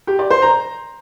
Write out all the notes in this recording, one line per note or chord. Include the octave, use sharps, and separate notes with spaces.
G4
D5
C5
A#5